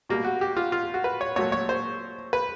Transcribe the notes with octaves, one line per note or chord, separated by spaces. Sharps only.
B2 G3 A#3
F#4
G4
F4
F4
F#4
B4
C#5
A#2 F#3 A3 C#5
C#5
C5
B4